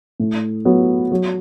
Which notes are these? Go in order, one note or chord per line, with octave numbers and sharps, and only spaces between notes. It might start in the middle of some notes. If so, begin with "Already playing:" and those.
A2
F#3 B3
F#3